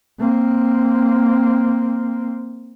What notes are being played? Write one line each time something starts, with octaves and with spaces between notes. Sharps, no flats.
A#3 C4